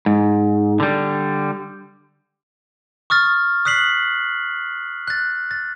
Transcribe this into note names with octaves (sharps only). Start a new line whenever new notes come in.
G#2
D3 G3
C#6 D#6 F6 A6
D#6 F#6 B6 C7 F#7
F#6 A6
A6